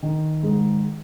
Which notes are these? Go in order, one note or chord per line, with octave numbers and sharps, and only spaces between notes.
D#3
G#2